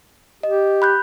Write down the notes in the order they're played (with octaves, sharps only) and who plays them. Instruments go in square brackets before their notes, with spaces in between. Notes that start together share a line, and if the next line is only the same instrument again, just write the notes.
[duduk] G4 [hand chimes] D#5
[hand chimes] B5 F#6 G6